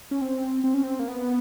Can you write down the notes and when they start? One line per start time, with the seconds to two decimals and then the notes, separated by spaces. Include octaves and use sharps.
0.11 C#4
0.21 C4
0.64 C4
0.74 C#4
0.83 C4
0.99 A#3
1.08 B3